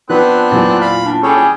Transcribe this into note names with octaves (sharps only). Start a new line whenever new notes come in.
F3 B3 C4 D4 B4 F#6
E2 A#2 F#3 D5
F5 B5
D4
G3 C#4 G#4 A4 C#5
G#4